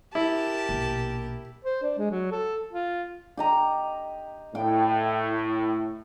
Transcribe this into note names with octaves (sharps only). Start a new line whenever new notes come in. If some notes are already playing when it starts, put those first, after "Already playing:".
E4 G4 A#4 A5
A#1 B2
C5
D4
G#3
F#3
A4
F4
G4 D#5 A#5
A2 G5